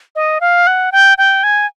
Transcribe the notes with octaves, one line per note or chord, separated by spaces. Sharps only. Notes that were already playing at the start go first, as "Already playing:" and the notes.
D#5
F5
F#5
G5
G5
G#5